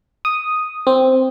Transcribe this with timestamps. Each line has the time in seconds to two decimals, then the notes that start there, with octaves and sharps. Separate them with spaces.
0.25 D#6
0.87 C4